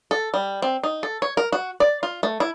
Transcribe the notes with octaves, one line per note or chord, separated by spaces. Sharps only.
A4
G3
C4
D#4
A4
C#5
A#4
F#4
D5
F4
A3
E4